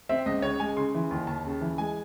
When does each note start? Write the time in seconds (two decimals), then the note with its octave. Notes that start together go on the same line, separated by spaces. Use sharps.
0.09 C4 E5
0.26 C#2 D#5
0.42 C#3 C#5
0.60 G#3 G#5
0.77 C#3 C6
0.94 E3
1.11 D#2
1.27 D#2 A5
1.45 C#3
1.61 E3
1.78 G#3 G#5